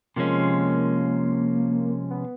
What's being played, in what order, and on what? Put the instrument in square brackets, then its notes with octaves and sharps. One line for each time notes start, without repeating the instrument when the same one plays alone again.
[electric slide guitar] C3 F3 G#3 C#4 [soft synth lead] A#3
[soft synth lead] B3